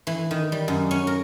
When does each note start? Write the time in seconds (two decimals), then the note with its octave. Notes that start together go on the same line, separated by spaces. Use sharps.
0.07 E3
0.31 D#3
0.52 G3
0.68 F#2
0.91 C#4
1.07 A#4